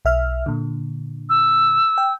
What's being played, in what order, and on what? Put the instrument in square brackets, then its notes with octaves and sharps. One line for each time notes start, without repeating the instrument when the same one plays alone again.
[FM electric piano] B1 E5 F6
A#2 D3
[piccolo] E6
[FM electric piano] G5